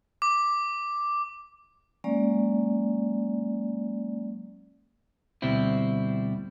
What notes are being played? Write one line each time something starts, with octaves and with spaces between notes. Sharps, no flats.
D6
F#3 G#3 A#3 C#4 D5
D2 B2 G3 C4 E4